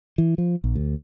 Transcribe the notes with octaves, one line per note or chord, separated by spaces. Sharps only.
E3
F3
A#1
D2